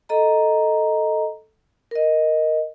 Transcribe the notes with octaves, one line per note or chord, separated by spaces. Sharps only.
A4 D#5 A#5
A#4 D#5